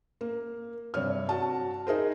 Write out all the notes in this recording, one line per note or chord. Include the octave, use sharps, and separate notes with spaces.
A#3
G2 C3 C#5 F6
F#4 A5
D#4 G#4 A#4 C5